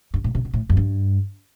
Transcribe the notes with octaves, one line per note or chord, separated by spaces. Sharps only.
G2
A2
C3
B2
A2
F#2
G2